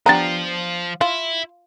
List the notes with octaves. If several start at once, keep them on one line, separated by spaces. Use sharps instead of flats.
F3 B3 D4 F4 G4 A#5 A6
E4 F4